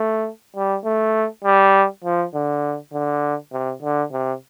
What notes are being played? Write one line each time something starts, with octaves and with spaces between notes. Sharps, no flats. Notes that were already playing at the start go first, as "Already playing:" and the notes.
Already playing: A3
G3
A3
G3
F3
D3
D3
C3
D3
C3